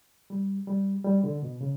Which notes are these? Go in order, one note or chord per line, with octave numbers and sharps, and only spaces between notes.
G3
G3
G3
D3
B2
C#3